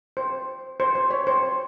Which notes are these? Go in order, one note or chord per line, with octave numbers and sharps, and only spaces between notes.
C5
C5
C5
C#5
C5